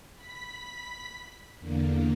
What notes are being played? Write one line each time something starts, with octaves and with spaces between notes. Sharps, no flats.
B5 B6
E2 D3 A#3